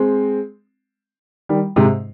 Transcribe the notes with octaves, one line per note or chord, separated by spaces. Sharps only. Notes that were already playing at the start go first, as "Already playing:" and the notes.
Already playing: G#3 C4
D#3 G3
G#2 C3